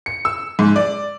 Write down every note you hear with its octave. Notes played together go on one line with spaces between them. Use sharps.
C#7
E6
G#2
D5